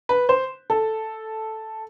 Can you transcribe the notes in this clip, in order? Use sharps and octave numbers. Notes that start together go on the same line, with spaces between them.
B4
C5
A4